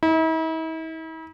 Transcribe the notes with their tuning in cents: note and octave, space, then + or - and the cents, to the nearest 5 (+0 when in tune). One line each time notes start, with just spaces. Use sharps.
E4 -45